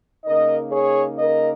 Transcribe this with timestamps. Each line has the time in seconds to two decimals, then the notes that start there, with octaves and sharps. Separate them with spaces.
0.25 C#3 A#3 D#4 A#4 D#5
0.71 G#4 C#5
1.17 A#4 D#5